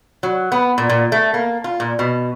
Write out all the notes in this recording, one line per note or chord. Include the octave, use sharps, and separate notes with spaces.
F#3
B3
A#2
A#2
A3
A#3
F4
A#2
B2